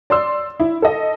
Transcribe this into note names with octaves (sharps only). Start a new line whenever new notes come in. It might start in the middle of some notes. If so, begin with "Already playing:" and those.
D5 C6 E6
E4
A4 D#5